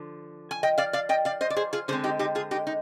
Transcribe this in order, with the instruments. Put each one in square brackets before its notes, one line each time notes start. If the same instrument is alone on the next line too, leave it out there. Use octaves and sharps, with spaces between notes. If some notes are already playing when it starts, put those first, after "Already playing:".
Already playing: [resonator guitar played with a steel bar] D3 F3
G#5
D#5 G5
D5 F5
D5 F5
D#5 G5
D5 F5
C5 D#5
D5
G#4 C5
F4 G#4
D3 G#3 C4 G#4 C5
D#4 G4
D#4 G4
F4 G#4
D#4 G4
D#4